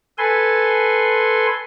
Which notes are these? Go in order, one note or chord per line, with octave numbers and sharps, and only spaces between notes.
A4 B4 G#5 C6